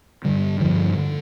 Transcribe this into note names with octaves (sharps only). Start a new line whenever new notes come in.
G2 D3 G3
G2 D3 F3
D3